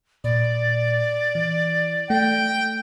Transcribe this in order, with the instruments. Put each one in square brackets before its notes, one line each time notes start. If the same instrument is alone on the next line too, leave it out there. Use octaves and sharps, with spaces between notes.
[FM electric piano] A#2 [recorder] D5
[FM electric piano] E3
[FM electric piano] A3 [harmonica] G5